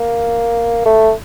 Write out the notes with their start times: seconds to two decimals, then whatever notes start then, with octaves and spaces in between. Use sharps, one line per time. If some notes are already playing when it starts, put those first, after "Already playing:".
Already playing: A#3
0.85 A3